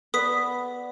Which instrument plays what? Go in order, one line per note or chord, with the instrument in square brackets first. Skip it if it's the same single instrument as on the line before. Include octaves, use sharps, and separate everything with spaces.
[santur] B3 D5 [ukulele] B4 [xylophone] D#6 B6